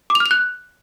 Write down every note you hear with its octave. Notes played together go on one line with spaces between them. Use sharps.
D6
F7
F6
F7
F#6